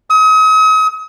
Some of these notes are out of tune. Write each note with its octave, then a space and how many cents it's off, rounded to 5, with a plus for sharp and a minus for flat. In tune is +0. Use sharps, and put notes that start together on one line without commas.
D#6 +40